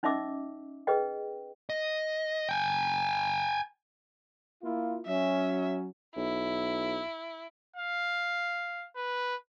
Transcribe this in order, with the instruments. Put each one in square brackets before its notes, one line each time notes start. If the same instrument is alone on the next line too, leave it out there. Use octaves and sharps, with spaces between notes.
[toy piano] C#4 D#4 D#5 E5 D6 E6
G#4 B4 D#5 G5
[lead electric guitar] D#5
G5 G#5
[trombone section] A#3 E4 F4
[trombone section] F#3 C#4 [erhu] E5
[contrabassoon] B1 [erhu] E4
[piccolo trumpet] F5
B4